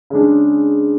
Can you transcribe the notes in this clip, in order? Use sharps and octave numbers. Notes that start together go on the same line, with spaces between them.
C#3 G#3 D4